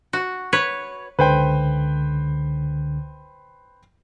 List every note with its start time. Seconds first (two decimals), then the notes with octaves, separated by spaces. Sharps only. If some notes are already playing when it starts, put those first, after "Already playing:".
0.13 F#4
0.53 B4 C#5
1.19 C#2 D3 B4 C5 G5